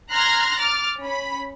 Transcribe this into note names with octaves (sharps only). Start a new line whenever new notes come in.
A#5 C6 F6 F#6 G#6 A#6
D6 F6 A6
C#4 B5